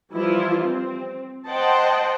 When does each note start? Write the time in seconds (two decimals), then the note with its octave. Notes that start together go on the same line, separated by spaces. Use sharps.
0.12 E3 F3 G3 E4 F4
0.62 C4
1.48 C5 D#5 F#5 G5 A5